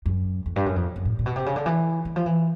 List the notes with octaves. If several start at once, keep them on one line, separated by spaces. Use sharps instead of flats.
F#2
F2
G2
F#2
F2
F#2
A2
A#2
B2
C3
C#3
D3
E3
E3
F3
E3